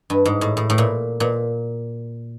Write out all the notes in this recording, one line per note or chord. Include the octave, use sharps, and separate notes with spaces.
G2
G#2
A2
A2
A2
A#2
A#2